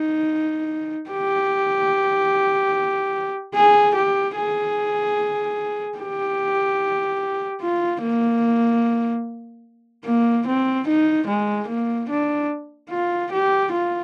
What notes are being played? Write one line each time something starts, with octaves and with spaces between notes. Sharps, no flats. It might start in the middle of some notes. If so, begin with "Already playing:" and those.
Already playing: D#4
G4
G#4
G4
G#4
G4
F4
A#3
A#3
C4
D#4
G#3
A#3
D4
F4
G4
F4